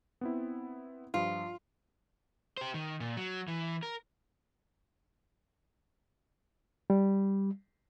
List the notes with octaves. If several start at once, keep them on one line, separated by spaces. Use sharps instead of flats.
B3 C4 E4
G2 F3 F4
G4 C5
D#3
A#2
F#3
E3
A#4
G3